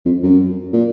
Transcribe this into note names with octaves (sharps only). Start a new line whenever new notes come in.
F2
F#2
A#2